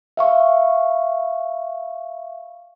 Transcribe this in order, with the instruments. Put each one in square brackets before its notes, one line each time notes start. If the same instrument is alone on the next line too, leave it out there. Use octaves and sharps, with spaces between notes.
[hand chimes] E5 F5 C#6